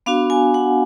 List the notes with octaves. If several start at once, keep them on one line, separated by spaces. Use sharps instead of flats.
B3 D4 F#4 F5
G#5
F#5